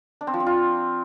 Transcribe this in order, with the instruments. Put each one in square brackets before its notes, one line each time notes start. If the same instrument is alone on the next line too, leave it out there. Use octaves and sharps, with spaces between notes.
[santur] D4
C4
F3
C4
F4